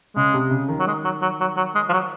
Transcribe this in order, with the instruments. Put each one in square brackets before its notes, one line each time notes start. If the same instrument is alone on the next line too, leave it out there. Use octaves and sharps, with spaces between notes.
[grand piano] C#3 [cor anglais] G#3
[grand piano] C3
C#3
D#3
[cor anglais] F#3
G#3
F#3
F#3
F#3
F#3
G#3
F3
F#3